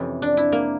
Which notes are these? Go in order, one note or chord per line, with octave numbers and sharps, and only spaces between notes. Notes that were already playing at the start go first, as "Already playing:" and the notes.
Already playing: F2 C3 E3 C#4
D4
E4
A#3